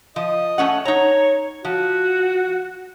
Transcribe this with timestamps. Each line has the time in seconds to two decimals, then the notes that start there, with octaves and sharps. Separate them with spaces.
0.16 F3 D#5
0.58 A3 C#4 F#5
0.85 D#4 C#5 A#5
1.65 F3 F#4